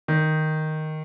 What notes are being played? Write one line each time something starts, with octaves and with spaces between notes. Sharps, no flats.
D#3